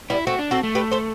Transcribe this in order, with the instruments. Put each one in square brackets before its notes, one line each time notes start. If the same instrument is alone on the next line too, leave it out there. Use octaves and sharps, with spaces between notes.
[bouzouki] G3 B3 [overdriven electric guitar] E4
[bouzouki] A3 C4 [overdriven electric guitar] F#4
[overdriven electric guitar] D4
[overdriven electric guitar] C4 [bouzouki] F#4 A4
[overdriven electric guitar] A3
[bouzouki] G4 B4
A4 C5